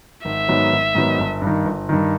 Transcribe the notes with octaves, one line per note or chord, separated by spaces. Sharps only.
G#1 E5
G#2 D#3 F#3 B3
G#1
G#2 D#3 F#3 B3
G1
G2
D#3
G1
G2 D#3